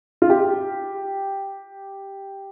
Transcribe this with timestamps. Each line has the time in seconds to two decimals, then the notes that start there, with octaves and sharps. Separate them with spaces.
0.22 F4
0.30 G4